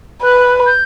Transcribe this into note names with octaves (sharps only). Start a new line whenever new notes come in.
B4 F#6
G6